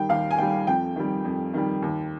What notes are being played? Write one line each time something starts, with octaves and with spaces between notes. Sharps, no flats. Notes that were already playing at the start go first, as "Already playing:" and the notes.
Already playing: D#3 G3 G5
D#2 F5
G#5
D#3 G3 G5
F2 G5
D#3 G3
F2
D#3 G3
D#2